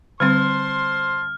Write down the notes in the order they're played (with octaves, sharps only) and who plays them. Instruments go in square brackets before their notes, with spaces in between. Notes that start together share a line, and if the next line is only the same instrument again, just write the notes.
[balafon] D3 G3 C4 [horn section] C5 A5 C6 [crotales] F6